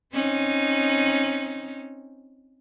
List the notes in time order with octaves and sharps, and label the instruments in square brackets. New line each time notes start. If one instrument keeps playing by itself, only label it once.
[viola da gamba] C4 C#4 D#4